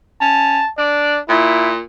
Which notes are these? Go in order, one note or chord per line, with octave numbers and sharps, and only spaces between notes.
C#4 A5
D4 D5
A#2 E4